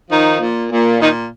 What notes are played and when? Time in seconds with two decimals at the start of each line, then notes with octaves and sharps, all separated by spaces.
0.10 D#3 F3 D#4
0.40 A#2
0.71 A#2
1.00 A#2 D#3 D#4